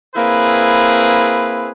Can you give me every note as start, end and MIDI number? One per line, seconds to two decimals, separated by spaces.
0.16 1.70 58
0.16 1.70 60
0.16 1.70 64
0.16 1.70 68
0.16 1.70 71